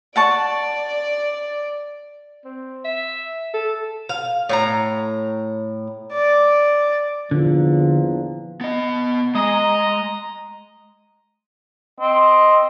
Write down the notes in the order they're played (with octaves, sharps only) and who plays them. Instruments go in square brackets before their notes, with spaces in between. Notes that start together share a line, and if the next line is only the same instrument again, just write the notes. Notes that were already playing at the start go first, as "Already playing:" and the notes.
[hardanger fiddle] D5 [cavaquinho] F#5 A5 C#6
[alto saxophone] C4
E5
A4
[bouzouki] F5
A2 F#4 A#5
[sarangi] D5
[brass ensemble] E2 A#2 F3 [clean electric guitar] D3
[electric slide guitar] B3 D#5
[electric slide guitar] G#3 [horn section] D#5 A#5
[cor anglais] C4 [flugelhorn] D#5